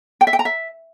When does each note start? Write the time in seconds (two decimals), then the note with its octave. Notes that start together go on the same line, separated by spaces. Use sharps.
0.21 G5
0.27 E5
0.33 G5
0.39 A#5
0.45 E5